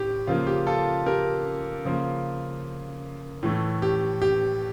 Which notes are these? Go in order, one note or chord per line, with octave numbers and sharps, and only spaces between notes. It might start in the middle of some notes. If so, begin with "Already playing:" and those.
Already playing: A2 G4
C#3 F3 A#3 F4
G4
F4 A4
G4 A#4
C#3 F3 A#3
A2 E3 A3
G4
G4